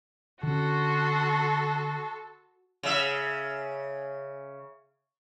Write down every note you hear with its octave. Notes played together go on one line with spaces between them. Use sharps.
D3 C#4 F#4 A4 C6
C#3 E5